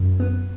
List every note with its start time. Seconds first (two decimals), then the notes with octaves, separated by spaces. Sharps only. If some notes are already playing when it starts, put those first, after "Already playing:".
Already playing: F#2
0.20 B3